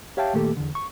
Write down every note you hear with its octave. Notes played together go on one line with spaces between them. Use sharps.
G4 C#5 E5 F5 G5 A5
A#2 D#3 A3 A#3 G4 A4
E2 D3
C#6